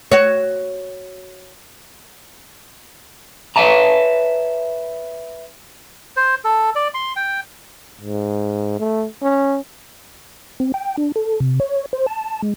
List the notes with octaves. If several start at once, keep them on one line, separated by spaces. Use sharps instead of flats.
F#4 C#5
B4 C#5 E5 A5 A#5
C5
A4
D5
C6
G5
G#2
A3
C#4
C4
G5
D4
A4
C3
C#5
C5
A5
G#3